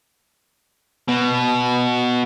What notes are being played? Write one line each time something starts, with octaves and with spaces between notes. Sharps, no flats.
B2